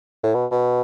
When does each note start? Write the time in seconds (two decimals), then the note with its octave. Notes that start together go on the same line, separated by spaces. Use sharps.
0.23 A2
0.34 B2
0.51 B2